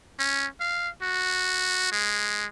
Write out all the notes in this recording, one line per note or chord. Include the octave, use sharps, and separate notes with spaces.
C#4
F5
F#4
G#3